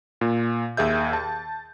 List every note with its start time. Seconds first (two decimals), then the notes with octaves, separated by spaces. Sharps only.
0.21 A#2
0.77 D#2 G#4 E5 G6
1.13 A5